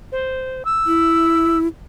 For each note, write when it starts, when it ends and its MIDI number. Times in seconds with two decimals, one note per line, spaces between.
0.12 0.63 72
0.65 1.58 88
0.87 1.68 64